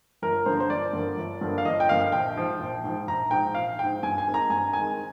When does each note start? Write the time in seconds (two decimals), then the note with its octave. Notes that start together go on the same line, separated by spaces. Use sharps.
0.22 G1 A#4
0.46 G2 D3 F3 A#3 C5
0.60 C5
0.70 G1 D5
0.93 G2 D3 F3 A#3
1.17 G1
1.41 G2 D3 F3 A#3
1.58 F5
1.65 G1 D#5
1.80 G5
1.89 G2 D3 F3 A#3 F5
2.01 F5
2.12 A#1 G5
2.36 G#2 F3
2.59 A#1
2.84 G#2 F3
3.08 A#1 A#5
3.31 G#2 F3 G5
3.55 A#1 F5
3.79 G#2 F3 G5
4.03 G2 G#5
4.18 G#5
4.27 D#3 G#3 C4
4.34 A#5
4.50 G2 G#5
4.73 D#3 G#3 C4 G#5